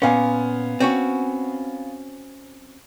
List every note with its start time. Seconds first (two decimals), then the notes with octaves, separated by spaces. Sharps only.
0.02 A#2 B3 C#4 F5 G#5
0.80 C4 C#4 F#4